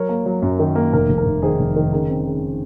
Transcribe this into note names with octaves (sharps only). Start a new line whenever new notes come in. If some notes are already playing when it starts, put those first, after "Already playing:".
Already playing: F#3 A#4 C#5
A#3
F#3
F#2
D#3
A#3
F1 A#4
F1
A#4
F1
D#3 G#4 C5
F1
D#3
C#3 A#4
C4
C#3